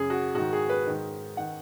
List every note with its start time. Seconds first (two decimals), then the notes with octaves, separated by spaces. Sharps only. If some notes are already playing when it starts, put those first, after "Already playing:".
Already playing: F#2 C#3 G#4
0.10 F#4
0.35 G#2 D#3 F#4
0.53 G#4
0.69 B4
0.87 G#2 D#3
1.37 D#3 F#5